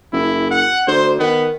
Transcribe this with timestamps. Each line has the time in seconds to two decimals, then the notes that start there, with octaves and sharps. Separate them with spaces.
0.13 F#1 E4
0.51 F#5
0.87 D2 C5
1.20 D#3 B3